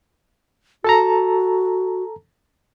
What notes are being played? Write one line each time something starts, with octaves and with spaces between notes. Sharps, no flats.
F#4 A4 A5 A#5